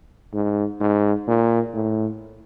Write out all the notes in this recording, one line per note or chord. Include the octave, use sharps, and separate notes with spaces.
G#2
G#2
A#2
A2